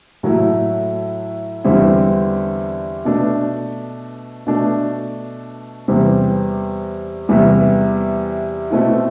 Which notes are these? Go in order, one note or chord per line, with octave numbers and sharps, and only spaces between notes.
A2 F#3 A3 E4
E2 D3 G3 C4 E4
B2 A3 D4
B2 A3 D4
E2 C3 G3 C4
E2 C3 G3 B3 E4
B2 A3 C4 E4